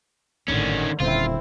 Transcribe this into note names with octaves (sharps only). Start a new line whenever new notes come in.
G#1 A2 D3 D#3 C#4
D#1 D3 C4 C#4 E4 F4